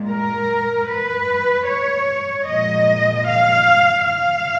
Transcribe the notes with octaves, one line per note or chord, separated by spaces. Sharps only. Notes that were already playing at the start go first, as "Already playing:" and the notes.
Already playing: A#2 G#3
A#4
B4
C#5
A#2 F3 G#3 D#5
F5
F5